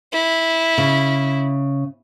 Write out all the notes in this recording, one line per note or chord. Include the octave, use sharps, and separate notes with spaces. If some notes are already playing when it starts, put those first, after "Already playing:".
E4
C#3